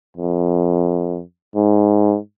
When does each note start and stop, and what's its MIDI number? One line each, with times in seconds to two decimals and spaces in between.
0.17 1.22 41
1.56 2.17 44